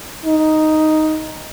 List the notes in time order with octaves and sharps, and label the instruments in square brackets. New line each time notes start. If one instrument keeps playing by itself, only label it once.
[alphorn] D#4